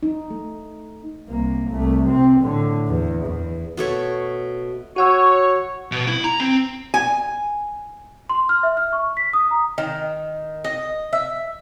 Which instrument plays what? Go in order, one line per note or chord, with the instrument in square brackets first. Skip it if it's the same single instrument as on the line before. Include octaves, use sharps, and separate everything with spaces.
[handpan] D#4
A3
[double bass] C2 A#3
C2 A3
C3 C4
A2 D3
E2
E2
[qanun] B2 A3 C#5
[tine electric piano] F#4 F#5 E6 [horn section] C#5
[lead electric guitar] B2
E4
A#5
C4
[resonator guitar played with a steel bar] G#5
[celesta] C6
F6
E5
F6
C#6
B6
D#6
A#5
[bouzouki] D#3
D#5
E5